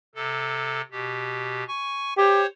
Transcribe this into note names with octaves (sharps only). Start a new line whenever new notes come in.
C3 A4
B2 G4
G#5 C#6
G4 C5 C#5